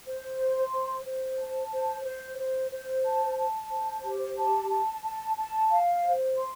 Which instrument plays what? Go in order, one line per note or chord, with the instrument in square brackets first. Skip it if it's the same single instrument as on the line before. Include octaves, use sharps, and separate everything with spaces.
[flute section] C5
C6
C5
C5
A5
C5
C5
C5
C5
A5
A5
C5
G4
A5
A5
A5
A5
F5
C5
C6